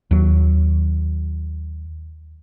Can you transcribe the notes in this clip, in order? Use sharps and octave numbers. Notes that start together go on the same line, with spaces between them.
D#2 F#3